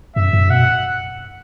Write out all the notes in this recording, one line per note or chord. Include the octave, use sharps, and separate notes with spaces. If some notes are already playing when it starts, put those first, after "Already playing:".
F#2 E5
F#2
B2 F#5